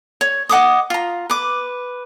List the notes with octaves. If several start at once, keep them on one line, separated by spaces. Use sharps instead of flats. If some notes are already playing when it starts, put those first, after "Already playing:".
C#5
D#5 F#5 D6 D#6
F4 A#5
B4 D6